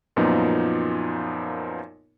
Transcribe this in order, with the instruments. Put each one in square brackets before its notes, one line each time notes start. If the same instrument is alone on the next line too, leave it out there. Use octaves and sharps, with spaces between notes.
[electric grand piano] F#2 A#2 F3 B3 D#4